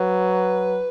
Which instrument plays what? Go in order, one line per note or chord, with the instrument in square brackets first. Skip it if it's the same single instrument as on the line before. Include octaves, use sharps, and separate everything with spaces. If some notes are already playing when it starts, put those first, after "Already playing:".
Already playing: [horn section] F#3 [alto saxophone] B4